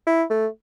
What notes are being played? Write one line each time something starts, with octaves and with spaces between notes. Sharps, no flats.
E4
A3